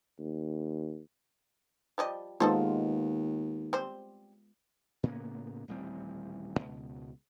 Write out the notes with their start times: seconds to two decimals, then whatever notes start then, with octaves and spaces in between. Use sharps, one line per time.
0.19 D#2
1.98 F3 G3 D#5
2.40 D#2 G#3 B3 D#4 F4 A4 C5
3.73 G3 C4 C5
5.03 A2 C#3 A#3 B3
5.68 D#1 A1 G3 C4
6.58 C#2 B2